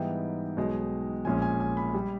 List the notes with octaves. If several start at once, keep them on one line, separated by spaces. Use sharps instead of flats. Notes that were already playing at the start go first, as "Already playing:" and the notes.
Already playing: G#2 E3 G3 B3 D#4 G5
B1 B2 G#3 D#4
A#1 A#2 G#3 C#4 G#5
G#5
G#5
B5
G3